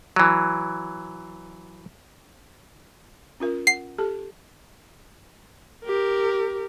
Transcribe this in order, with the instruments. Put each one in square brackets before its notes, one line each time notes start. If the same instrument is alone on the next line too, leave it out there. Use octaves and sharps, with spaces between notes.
[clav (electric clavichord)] E3 F#3
[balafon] C#4 F4 A#4
[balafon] F#5 [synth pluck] C7
[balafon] G4 A4 A5
[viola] G4 A#4